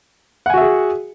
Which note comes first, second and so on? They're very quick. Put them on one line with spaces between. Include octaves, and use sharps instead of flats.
F#5 G#5 F#4 E5 G#4